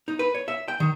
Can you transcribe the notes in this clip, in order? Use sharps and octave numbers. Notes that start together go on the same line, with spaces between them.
D#4
B4
C#5
E5
G5
D#3